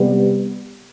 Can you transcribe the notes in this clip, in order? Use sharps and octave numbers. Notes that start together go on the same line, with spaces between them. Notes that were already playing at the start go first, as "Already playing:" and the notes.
Already playing: C3 G3 B3